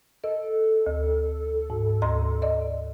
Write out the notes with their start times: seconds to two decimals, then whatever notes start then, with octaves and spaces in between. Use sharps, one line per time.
0.24 A4 D#5
0.86 D2
1.70 G#2
2.02 D2 A#5 C6
2.42 D5 D#5